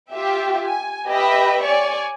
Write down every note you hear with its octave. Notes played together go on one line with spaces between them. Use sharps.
F4 G4 E5 G5
G#5
G4 B4 D#5 E5 G5 B5
C#5 D5 G#5 C#6